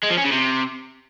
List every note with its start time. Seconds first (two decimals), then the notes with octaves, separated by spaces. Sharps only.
0.03 G#3
0.11 F3
0.18 C#4
0.25 C#3
0.32 C3